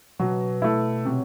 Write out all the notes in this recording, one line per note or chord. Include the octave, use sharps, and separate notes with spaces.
B2 F#3
A3 E4
C3 F#3